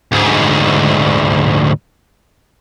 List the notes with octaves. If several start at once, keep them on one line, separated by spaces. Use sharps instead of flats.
D2 G#2